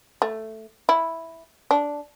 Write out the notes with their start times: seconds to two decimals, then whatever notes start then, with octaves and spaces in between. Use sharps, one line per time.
0.22 A3
0.89 E4
1.71 D4